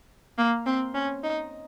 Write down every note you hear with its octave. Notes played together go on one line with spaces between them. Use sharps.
A#3
C4
C#4
D#4